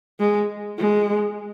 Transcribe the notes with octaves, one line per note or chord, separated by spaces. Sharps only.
G#3
G#3